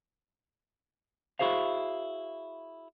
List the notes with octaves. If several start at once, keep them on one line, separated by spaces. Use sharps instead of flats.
E4 F#4 G#4 C5 F5